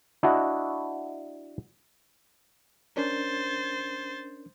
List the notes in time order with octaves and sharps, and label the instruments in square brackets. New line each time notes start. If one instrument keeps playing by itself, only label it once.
[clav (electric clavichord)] D4 E4 F#4 D#5
[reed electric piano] C#4 D4 A#4 [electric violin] C5 A6